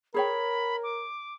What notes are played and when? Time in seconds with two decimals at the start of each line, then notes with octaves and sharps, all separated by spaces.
0.14 G#4 A#4 C#5 G5 B5
0.83 D6